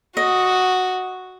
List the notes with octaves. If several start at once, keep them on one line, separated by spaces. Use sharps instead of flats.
F#4 D#5